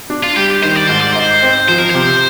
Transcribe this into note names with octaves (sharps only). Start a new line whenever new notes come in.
D4
F4
G3 G4
D#3 C5
D5
G#2 C5
D5
D#4 C5
C4
F3 C5
A#4
C3 C5